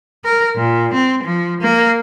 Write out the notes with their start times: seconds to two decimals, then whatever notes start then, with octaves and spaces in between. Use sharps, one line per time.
0.24 A#4
0.55 A#2
0.94 C4
1.23 F3
1.61 A#3